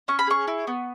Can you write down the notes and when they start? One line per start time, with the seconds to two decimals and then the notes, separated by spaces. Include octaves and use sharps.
0.08 C#4 C#6
0.19 B5
0.27 G#4 C#6
0.47 E4
0.67 B3